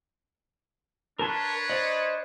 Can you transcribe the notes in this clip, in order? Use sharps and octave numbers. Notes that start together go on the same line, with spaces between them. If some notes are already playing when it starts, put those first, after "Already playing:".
D4 A#4 B4 C#5 A5 C6
C5 D5 D#5